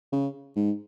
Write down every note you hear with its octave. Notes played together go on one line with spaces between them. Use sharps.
C#3
G#2